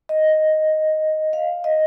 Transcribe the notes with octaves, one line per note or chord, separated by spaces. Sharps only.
D#5
F5
D#5